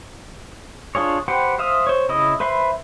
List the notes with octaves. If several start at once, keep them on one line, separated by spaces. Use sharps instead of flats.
D4 F4 G#4 C#5
G4 B4 C5 F#5 G5
C5 E5 F5 D#6
C5 C#5
C#3 E4 D#5 D#6
B4 C5 E5 B5 C6